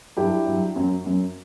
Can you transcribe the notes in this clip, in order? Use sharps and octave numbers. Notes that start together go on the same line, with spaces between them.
G2 F#3 E4 G4
G2 F#3
F#2 F#3
F#2 F#3